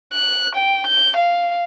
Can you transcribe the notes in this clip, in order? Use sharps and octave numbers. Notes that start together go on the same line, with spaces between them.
F#6
G5
G6
F5